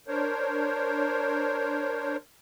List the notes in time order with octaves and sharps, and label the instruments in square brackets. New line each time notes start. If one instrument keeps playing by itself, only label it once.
[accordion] D4 A#4 C5 C#5